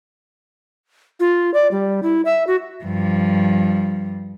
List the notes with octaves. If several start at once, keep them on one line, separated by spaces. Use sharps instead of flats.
F4
D5
G3
E4
E5
F#4
G2 F3